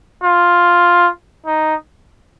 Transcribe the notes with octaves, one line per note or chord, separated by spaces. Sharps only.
F4
D#4